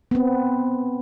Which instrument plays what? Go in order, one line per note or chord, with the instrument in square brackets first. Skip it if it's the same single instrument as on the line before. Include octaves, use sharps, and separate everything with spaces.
[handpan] B3 C4